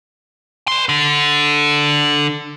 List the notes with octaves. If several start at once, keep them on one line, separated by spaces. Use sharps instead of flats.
B4 C6
D3